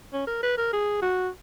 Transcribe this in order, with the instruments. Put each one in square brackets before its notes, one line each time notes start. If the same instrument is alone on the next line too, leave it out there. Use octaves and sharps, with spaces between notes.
[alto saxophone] C#4
A#4
B4
A#4
G#4
F#4